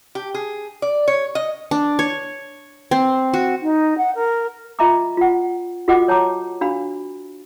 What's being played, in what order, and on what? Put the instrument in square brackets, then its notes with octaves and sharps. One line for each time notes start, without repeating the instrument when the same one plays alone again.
[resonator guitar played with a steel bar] G4
G#4
D5
C#5
D#5
[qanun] D4
C#5
C4
F#4
[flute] D#4
F#5
A#4
[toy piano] F4 D#5 E5 A#5 B5 D6
F4 F#5
F4 F#4 A4 D#5 F#5 D6
C#5 A5 A#5 D6
D4 F#4 F5 B5